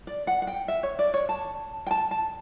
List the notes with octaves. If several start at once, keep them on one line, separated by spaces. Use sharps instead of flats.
D5
F#5
F#5
G5
E5
C#5
D5
C#5
A5
G5
A5
A5